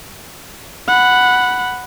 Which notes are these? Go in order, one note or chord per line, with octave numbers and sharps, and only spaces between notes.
F#5 B5